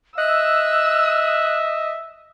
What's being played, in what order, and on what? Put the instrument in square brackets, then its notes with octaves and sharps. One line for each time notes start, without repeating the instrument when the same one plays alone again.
[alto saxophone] D#5 [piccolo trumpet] E5 [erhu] E6 [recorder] F#6